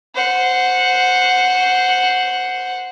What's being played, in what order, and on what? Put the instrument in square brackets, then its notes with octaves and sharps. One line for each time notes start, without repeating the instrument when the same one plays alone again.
[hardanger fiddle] C5 F#5